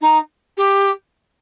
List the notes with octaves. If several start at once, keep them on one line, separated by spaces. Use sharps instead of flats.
D#4
G4